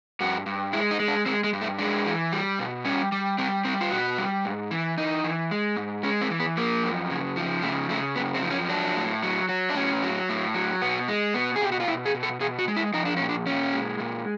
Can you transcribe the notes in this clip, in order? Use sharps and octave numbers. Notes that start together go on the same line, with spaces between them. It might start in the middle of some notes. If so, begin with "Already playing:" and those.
G2 F#4
G2
G#3 E4
D#4
G#3
D4
G#3 C4
G#3
G2
A3
G#3 D4
E3
G3
B2
G3 C#4
G3
G3 C4
G3 C4
F4
B2 F#4
G3
G#2
E3
E3 D#4
E3
G#3
G#2
G#3 C#4
C4
E3
B3
F3 A#3
F#2
C#3
F3
C#3 A3
C#3 A3
F#2 B3
C4
F3
C#4
F#3 D4
A2
F#3
F#3
D4
A2 C#4
F#3
A2
F#3
B2 B3
G#3
B2 B3
G#4
B2 G4
F#4
F4
B2 E4
G#4
B2
A4
B2 G#4
F#4
G#3
E4
F3 D#4
D4
A#2 C#4
D4
A#2 C#4
G#3
A#2